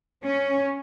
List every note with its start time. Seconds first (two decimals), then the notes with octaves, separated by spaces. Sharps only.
0.25 C#4